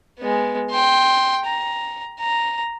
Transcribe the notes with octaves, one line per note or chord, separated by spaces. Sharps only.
G#3 B3
G5 C6
A#5
A#5